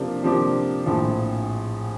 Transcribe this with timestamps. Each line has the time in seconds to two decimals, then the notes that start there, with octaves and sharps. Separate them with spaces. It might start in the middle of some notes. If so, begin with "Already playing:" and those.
Already playing: C3 F3 A#3 D4 G4
0.23 C3 F3 A#3 D4 G4
0.86 A#1 A2 F3